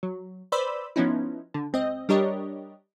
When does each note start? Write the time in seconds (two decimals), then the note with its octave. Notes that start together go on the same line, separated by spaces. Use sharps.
0.03 F#3
0.52 B4 C5 D5 B5 E6
0.96 F3 B3 C#4 D#4 E4
1.54 D3
1.73 C#2 C4 D#5
2.09 G3 D4 G4 A#4 C#5 D#5